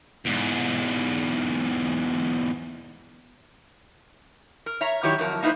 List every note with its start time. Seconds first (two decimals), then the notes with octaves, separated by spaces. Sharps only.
0.26 E2 G#2
4.66 A#4
4.81 C#5 E5 A#5
5.03 D#3 F#3 E4 G4 C#5
5.19 F2 F#3 A#4 A5
5.42 A#3 D#4 E4 F#4 B4 C5